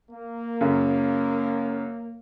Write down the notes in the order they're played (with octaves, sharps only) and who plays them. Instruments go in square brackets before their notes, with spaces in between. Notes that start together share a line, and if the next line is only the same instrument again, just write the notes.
[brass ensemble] A#3
[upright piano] F#2 C#3